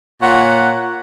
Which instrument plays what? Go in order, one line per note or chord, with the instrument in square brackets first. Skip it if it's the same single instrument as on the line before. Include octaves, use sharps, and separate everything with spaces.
[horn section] A#2 C#5 F#5